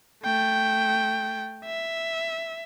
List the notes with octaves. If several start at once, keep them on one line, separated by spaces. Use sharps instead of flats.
A3 G5
E5